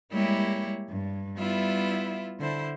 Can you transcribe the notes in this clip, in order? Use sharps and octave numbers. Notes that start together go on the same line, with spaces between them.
G3 G#3 A#3 E4 G4 C#5
G2
G3 B3 E4 F4 E5
D3 E4 C5